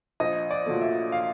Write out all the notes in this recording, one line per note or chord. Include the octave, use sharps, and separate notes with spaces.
A#1 D#5
D5
A#2 F#3 A3
E5
F5